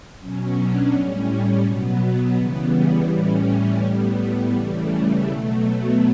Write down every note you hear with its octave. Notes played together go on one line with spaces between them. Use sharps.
B2 F#3 C#4
D4
A2 G3 C#4
B2 F#3 B3
B3
C#3 E3 G3 B3
A2 E3 G3 C#4
A2 G3 B3
B3
C#3 E3 G3 A3
B2 F#3 A3
B3